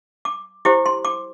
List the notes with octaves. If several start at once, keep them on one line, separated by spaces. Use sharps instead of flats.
D6
E4 G4 C5 D6
C6
D6